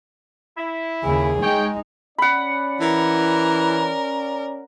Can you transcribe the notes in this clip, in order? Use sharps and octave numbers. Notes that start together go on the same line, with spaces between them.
E4
D#2 C#3 G#4
G#3 D#4 C#5 G5
C#4 D5 F#5 B5
E3 A#4